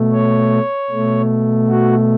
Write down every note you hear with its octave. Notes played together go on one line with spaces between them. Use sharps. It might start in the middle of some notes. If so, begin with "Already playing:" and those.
Already playing: B2 A3
C#5
B2 A3
F#4